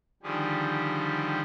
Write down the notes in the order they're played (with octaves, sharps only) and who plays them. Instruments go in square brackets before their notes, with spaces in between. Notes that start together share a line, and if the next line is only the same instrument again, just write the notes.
[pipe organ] D3 D#3 F3 G3 G4 G#4